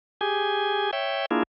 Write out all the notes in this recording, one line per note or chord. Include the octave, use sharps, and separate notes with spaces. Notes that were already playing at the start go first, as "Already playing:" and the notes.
G4 G#4 G#5
C#5 E5 G5
A#3 D4 E4 F4 G#4